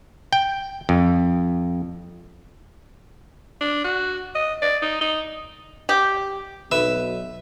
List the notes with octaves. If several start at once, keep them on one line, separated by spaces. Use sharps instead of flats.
G5
F2
D4
F#4
D#5
D5
D#4
D#4
G4
B1 B4 E5